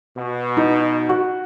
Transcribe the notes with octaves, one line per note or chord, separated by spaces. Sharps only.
B2
D#4
F#4